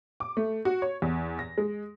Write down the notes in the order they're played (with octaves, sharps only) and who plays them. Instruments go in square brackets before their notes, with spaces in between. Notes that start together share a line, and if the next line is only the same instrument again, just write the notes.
[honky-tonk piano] D6
A3
F#4
C#5
E2
A#6
G#3